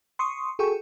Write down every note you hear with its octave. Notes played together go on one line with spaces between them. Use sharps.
C6 C#6 D#6
F#4 G#4 A4 G5 C#6